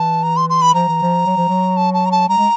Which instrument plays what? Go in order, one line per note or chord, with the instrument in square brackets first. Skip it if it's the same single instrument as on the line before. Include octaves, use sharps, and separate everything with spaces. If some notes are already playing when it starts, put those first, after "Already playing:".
Already playing: [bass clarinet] E3 [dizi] A5
[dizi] A#5
C6
C6
B5
[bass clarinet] F3 [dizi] A#5
[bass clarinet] E3
F3
F#3
F3
F#3
[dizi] A5
A5
A#5
A5
[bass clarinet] G3 [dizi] A#5
[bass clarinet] G#3